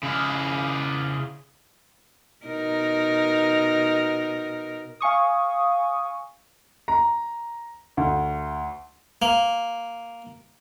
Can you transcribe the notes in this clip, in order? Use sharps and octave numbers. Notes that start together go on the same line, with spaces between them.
C#3 E4
B2 D#4 A#4
F5 G#5 C#6 D#6
A#5
D2
A#3